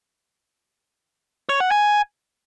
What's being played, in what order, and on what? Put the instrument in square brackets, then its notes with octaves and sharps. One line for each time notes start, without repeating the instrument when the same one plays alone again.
[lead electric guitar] C#5
F#5
G#5